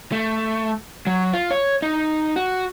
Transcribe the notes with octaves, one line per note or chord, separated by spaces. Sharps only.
A3
F#3
F4
C#5
D#4
F#4